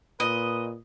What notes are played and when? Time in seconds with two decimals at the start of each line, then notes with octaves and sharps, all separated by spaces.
0.20 A#2 B4 D#5